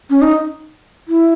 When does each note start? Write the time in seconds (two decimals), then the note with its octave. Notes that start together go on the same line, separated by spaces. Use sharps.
0.10 C#4
0.22 D#4
1.08 E4